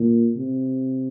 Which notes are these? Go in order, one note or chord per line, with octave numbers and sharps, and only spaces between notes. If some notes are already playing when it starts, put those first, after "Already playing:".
Already playing: A#2
C3